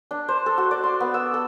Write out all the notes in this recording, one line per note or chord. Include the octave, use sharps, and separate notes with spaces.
D4
C5
A4
F#4
D5
C6
B3
E6
A4